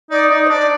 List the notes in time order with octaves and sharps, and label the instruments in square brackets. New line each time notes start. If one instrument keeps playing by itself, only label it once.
[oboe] D#4 [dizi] D5
[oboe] D#4 [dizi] D5
[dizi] C5
[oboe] D4 [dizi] D5